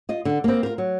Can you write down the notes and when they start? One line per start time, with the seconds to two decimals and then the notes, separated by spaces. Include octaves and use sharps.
0.09 F4 D#5
0.25 D3
0.44 A#3 C4
0.63 F4 A#4
0.78 F#3